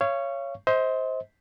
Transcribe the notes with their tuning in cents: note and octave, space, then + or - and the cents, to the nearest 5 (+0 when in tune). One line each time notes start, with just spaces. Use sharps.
C#5 +0 F5 -35 C#6 +0
C5 +0 D#5 +40